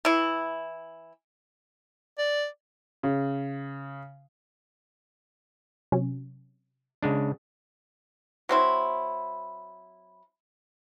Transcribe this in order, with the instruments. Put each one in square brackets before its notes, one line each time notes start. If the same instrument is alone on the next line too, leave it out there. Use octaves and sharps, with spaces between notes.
[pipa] E3 E4
[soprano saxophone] D5
[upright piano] C#3
[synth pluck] C3 F#3 C#4
[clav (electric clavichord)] C#3 G#3 D4
[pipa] F#3 C4 E4